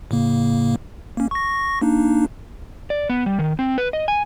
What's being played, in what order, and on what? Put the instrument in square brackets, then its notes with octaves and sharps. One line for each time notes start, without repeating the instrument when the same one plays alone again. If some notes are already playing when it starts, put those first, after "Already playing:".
[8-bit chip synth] A2 C#3 A#3
A#3 C#4
C#6 A#6
A#3 D4 D#4
[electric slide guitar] D5
B3
G3
D#3
C4
B4
D#5
G#5